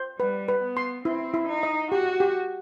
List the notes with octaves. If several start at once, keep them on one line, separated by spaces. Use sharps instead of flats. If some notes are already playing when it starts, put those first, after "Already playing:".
Already playing: C5
G3 B4
B4
B3
C6
C4 E4
E4
D#4
D#5
F#4 G4
G4